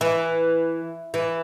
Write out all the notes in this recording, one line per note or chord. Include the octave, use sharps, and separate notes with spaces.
E3
E3